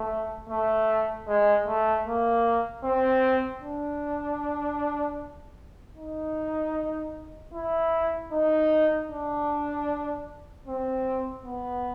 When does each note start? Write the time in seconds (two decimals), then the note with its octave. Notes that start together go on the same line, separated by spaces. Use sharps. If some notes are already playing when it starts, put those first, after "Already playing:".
Already playing: A3
0.49 A3
1.28 G#3
1.67 A3
2.06 A#3
2.84 C4
3.62 D4
5.97 D#4
7.54 E4
8.32 D#4
9.10 D4
10.67 C4
11.45 B3